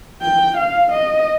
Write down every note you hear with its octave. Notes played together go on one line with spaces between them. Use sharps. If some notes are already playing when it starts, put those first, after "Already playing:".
G5
F5
D#5